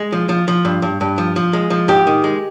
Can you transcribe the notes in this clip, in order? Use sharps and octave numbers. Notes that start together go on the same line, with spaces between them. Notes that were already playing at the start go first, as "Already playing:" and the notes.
Already playing: G#3
F3
F3
F3
G2
G2
G2
F3
F3
G#3
F3
G#2 G4
D#3
G#3